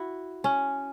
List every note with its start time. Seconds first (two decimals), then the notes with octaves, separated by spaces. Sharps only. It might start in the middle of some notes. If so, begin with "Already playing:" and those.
Already playing: E4 F#4
0.44 C#4